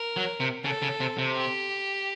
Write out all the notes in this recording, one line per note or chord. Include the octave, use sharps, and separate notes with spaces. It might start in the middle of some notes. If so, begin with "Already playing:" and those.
Already playing: A#4
F#3
C3
C#3 A4
C#3
C3
C3
G4